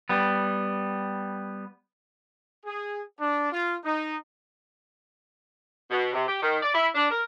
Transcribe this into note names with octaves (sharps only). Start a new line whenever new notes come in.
G3 B3
G#4
D4
F4
D#4
B2
C3
G4
D#3
D5
E4
D4
A#4